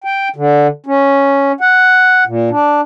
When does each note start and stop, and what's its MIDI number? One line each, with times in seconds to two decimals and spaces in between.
0.04 0.28 79
0.36 0.67 50
0.86 1.52 61
1.61 2.24 78
2.27 2.49 46
2.50 2.81 62